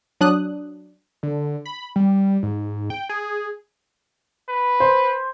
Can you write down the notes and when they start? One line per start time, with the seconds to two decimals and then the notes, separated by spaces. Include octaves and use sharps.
0.21 F#3 D4 D#6 F#6
1.23 D3
1.66 B5
1.96 G3
2.43 G#2
2.90 G5
3.09 G#4
4.49 B4
4.80 C5